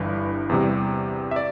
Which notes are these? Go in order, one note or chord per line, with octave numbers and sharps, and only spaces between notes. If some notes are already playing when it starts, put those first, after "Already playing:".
Already playing: G1 G2 E3
E2 C3 G3
E5
D5